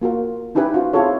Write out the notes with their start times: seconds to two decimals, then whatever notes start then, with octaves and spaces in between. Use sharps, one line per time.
0.02 A#3 F4 F#4 A#4
0.55 C#4 D#4 E4 G4 B4 G#5
0.74 C#4 F4 F#4
0.93 C4 E4 F4 G#4 A4 C#5